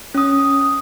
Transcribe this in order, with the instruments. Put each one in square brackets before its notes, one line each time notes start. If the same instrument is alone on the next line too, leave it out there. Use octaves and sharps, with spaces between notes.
[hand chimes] C#4 D#6